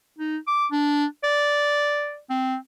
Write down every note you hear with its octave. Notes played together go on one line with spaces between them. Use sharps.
D#4
D6
D4
D5
C4